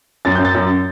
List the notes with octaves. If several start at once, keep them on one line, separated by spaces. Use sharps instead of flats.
F#2 A6
F#2 G6
A6
F#2